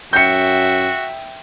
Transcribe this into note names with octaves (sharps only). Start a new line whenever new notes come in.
F#2 F#4 E5 G5 G6 C#7